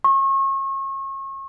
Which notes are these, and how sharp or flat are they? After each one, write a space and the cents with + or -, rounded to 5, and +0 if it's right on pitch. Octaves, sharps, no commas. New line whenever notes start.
C#6 -35